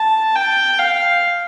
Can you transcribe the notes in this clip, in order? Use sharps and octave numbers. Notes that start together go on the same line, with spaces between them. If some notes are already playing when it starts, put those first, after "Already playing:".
Already playing: A5
G5
F5